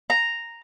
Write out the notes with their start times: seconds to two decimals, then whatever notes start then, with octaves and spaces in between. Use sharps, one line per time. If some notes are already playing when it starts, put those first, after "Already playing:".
0.10 A#5